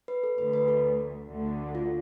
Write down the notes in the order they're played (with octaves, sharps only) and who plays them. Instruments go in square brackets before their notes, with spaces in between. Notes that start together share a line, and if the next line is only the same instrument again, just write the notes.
[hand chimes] B4
A4
[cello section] D2 D3 A3 [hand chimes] B4
[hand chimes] B4
A4
[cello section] D2 D3 A3
[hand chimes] F4